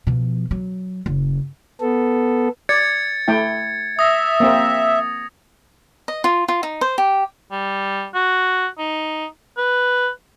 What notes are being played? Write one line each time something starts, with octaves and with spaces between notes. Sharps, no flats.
B2 F3
F#3
F#1
B3 A4
D5 G#6 A6 C#7
A3 E4 G5
E5 D#6 A#6
A#3 C4 A#4
D#5
F4
F4
D#4
C5
G4
G3
F#4
D#4
B4